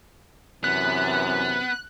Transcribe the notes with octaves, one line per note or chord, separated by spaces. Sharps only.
F#2 C3 E3 B3 F#6